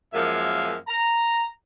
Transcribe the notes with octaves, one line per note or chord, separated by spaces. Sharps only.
F#2 F3 G#3 A#3 E5 F5
A#5